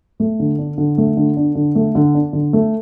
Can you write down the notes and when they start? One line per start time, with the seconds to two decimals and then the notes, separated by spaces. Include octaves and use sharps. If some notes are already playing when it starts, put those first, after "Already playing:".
0.20 A3
0.40 D3
0.59 D4
0.78 D3
0.98 A3
1.17 D3
1.37 D4
1.55 D3
1.75 A3
1.95 D3
2.15 D4
2.33 D3
2.53 A3